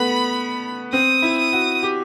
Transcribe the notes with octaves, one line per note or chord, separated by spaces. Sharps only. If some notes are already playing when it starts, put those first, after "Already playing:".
Already playing: A3 B3 B5
C4 D#6
E4
D#6
F#4
G4